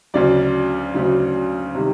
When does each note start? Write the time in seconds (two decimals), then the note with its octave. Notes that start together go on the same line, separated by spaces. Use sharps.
0.14 D2 C#3 F#3 D5
0.94 D2 C#3 F#3
1.75 C3 D#3 G3